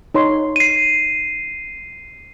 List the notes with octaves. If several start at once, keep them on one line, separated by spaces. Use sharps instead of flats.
D#4 C#5 C6
C7 D#7